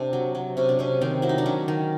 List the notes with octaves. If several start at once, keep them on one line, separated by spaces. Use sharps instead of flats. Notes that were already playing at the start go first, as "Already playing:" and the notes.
Already playing: C3 C4 D4
F#3
F#3
C3 C#4
D4
C3 C#4
D#3 C4
F#3 E4
D#4
D4
F#3 C#4
D#3